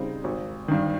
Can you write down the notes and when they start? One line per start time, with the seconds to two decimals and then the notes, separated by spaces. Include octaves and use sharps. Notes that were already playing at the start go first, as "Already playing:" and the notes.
Already playing: C#3 G3 C4 D#4
0.24 G#1
0.68 G2 D#3